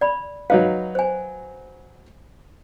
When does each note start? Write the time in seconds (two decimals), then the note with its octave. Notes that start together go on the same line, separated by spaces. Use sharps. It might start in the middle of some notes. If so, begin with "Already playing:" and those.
0.01 D5 B5
0.50 F#3 D#4 B4 F5
0.95 C5 G#5